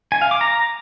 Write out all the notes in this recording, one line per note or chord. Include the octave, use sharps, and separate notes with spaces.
G#5
F5
D6
A#5